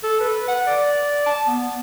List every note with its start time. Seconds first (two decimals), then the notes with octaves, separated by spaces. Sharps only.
0.03 A4
0.20 B4
0.48 F#5
0.67 D5
1.26 A5
1.47 B3